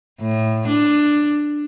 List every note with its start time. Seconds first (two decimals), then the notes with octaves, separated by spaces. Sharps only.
0.20 A2
0.68 D4